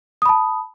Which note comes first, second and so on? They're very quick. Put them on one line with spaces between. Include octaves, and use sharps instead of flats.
D#6 B5 A5